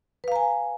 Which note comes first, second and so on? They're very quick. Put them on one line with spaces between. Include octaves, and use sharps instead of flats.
B4 F5 A#5 G#5